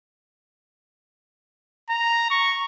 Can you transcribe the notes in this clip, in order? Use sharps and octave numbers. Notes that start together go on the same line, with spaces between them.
A#5
C#6